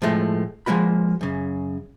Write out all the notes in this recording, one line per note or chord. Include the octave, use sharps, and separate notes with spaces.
A2 F3 G#3 A3
F3 G#3 A#3 F#4 B5
F#2 C#3